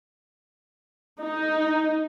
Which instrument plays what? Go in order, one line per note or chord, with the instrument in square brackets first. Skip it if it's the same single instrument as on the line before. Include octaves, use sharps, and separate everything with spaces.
[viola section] D#4